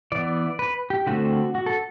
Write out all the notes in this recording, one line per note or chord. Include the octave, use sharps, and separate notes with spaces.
E3 B3 D5
B4
G4
D3 A3 C4 F#4
F#4
A4